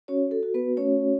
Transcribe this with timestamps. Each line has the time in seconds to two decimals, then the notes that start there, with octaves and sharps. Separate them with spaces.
0.08 C#4 F#4 C#5
0.31 A4
0.43 F#4
0.54 B3 B4
0.77 A3 C#4 C#5